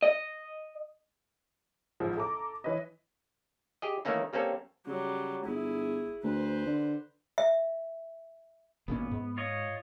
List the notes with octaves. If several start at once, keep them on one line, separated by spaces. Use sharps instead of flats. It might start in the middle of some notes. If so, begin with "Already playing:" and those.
D#5
A1 G#2 F3
A4 A#5 D6
E3 B4 C#5 D#5
G4 G#4 D#5
D#3 E3 A3 A#3 C#4 D#4
G3 A#3 C4 C#4 A4
C#3 F#3 G3
G1 E4 G#4
D2 B4 C5
D3
E5
G#1 A#2 B3 C#4
G#2
F4 C#5 D#5